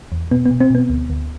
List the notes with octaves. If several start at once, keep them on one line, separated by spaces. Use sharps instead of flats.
E2
B2 B3
B3
B2
C4
B2 B3
D2
D2